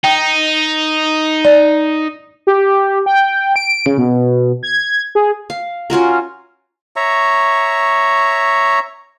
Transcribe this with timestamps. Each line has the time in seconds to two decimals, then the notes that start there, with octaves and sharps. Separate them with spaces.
0.04 D#4 G5
1.45 D5
2.47 G4
3.06 G5
3.56 D7
3.86 C#3
3.98 B2
4.63 G#6
5.15 G#4
5.50 F5
5.90 C#4 F4 F#4 A#4
6.96 C#5 E5 A#5 C#6